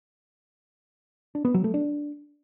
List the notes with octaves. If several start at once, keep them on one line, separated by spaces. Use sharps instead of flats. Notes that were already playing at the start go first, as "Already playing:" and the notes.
D4
B3
F#3
A3
D4